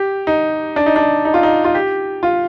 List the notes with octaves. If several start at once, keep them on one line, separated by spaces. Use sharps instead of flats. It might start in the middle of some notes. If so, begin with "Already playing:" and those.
Already playing: G4
D#4
D4
D#4
D4
D#4
F4
D#4
F4
G4
F4